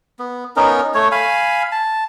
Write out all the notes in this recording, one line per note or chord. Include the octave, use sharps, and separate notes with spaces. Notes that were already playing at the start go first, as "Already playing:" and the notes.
B3
B3 C#4 D#4 A#4
A3 C#5
F5 G#5 B5
A5